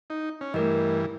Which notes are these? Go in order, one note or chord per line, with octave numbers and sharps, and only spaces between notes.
D#4
C#4
G2 E3 A3 A#4 D#5